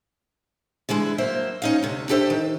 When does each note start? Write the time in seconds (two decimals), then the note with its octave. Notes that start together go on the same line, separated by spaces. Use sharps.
0.89 D3 E3 G#3 E4
1.18 F#3 A#3 C5 E5
1.62 C#4 D#4 F5
1.83 D2 C3
2.09 D4 G4 A4 C5 E5
2.30 D#3